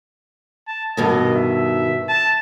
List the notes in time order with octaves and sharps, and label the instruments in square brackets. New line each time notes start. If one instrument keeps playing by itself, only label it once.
[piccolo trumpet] A5
[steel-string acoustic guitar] G2 B2 D#3 [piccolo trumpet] D#5
[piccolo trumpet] E5
A5